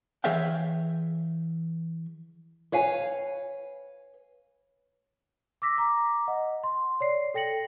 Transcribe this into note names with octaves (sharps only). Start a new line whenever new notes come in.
E3 G#4 C#5 E5 F5 G5
B4 C#5 F5 G#5
D6 E6 A#6 B6
A#5 D6
D#5 F#5
C6
C#5 D5 C7
A4 G5 A#6 C#7 F#7